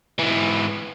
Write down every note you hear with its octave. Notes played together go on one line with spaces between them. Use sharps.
G#2 E3